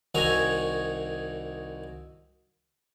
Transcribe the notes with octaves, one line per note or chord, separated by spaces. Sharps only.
C2 D#3 F#4 C#5 G#5 A#5